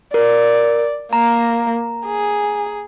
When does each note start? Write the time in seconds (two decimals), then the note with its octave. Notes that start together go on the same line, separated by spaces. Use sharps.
0.14 A#4 D5
1.13 A#3 A#5
2.05 G#4